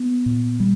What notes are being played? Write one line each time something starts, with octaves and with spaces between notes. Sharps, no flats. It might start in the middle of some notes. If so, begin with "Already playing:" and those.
Already playing: B3
A#2
G3